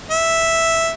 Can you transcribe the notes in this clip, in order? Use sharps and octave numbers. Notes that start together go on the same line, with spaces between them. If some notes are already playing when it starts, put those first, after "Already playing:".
E5